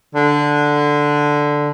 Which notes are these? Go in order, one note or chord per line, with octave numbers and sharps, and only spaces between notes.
D3